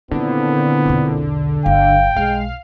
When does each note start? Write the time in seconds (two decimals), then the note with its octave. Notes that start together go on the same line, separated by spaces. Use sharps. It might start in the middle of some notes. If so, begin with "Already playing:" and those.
0.11 A#2 D3 D#3 B3 C4 E4
0.86 B1 E2
1.66 G1 F5 G5
2.17 B1 G#3 F5